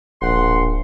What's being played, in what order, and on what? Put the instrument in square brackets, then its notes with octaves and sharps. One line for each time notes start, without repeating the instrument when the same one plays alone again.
[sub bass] D1 [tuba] A#1 [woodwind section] F#5 C6